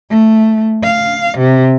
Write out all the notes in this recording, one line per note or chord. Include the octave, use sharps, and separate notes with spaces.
A3
F5
C3